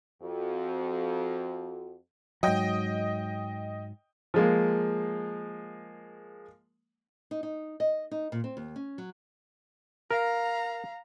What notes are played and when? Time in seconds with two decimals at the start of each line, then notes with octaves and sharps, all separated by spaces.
0.22 F2 F#4
2.43 G#2 F#3 D#5 G5
4.34 F3 G#3 A#3
7.31 D#4
7.43 D#4
7.80 D#5
8.11 D#4
8.32 A#2
8.44 C4
8.57 D#2
8.76 C#4
8.98 F#3
10.11 A#4 F5 A#5